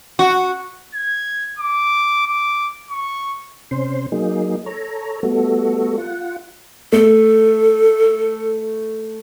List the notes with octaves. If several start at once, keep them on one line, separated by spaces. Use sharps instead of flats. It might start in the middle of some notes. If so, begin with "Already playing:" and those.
F#4
G#6
D6
D6
C#6
C3 C#4 C5 C6
F#3 A#3 D#4 G#4
A4 C#5 A#5
G3 A3 B3 F#4 A4
F4 F#5
A3 A4